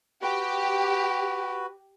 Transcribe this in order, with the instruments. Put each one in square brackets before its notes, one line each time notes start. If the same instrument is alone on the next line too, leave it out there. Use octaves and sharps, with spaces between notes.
[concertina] F#4 B4 [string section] G4